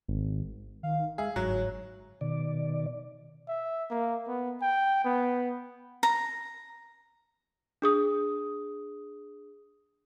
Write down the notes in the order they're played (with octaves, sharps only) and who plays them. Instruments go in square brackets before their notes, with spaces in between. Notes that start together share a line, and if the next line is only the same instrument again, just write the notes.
[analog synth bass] G#1
[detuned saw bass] D#3 [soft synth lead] F5
[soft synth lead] G#3 [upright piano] G#4 [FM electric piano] E5 F5
[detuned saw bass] G1 [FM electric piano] G#2 A#5 F#6 [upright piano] F#3 [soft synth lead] C#5
[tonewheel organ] B2 D#3 D5
[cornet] E5
A#3
B3
G5
B3
[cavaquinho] A#5
[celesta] D4 G#4 D#6